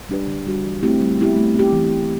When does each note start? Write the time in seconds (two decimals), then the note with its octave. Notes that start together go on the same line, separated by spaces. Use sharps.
0.09 G3 D4 G4 B4
0.27 D3
0.46 G3 D4 F#4
0.64 E3
0.83 A3 C4 E4 G4
1.01 G3
1.18 B3 E4 G4
1.36 A3
1.54 C4 G4
1.73 E3